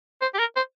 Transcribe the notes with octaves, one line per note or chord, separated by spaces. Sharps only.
C5
G4
A#4
C5